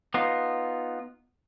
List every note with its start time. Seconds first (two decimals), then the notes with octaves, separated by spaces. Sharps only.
0.14 B3 D#4 F4